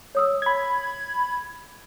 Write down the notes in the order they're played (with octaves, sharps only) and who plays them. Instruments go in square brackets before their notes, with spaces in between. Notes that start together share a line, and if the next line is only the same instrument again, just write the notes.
[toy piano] C#5 D#6 E6
[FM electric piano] B5 G#6